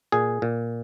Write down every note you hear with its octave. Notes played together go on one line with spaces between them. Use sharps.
A#2 G#4
A#2